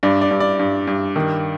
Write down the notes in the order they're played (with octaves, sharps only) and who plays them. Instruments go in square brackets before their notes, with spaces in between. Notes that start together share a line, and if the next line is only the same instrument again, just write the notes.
[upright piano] G2 D5
D5
G2
D5
G2
G2
D#3